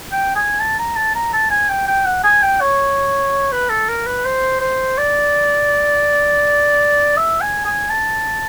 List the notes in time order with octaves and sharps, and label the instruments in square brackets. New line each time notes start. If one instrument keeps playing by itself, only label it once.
[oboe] G5
G#5
A5
A#5
A5
A#5
A5
G#5
G5
G5
F#5
G#5
G5
C#5
B4
A4
A#4
B4
C5
C5
D5
E5
G#5
G#5
A5